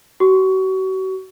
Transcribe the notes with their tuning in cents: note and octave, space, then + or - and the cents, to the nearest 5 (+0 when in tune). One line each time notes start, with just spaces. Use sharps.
F#4 +40 C#6 +20